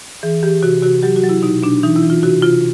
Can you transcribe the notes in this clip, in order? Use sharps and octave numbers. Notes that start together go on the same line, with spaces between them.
E3 G#4
E3 G4
C3 F#4
C3 F#4
F#3 G4
F#4
F#3
E4
B2 D#4
B2 D4
E3 D#4
E4
E3
F4
C3 F#4
C3 F4